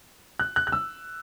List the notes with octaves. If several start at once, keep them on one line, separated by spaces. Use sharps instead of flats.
F#6
F#6
F#6
E6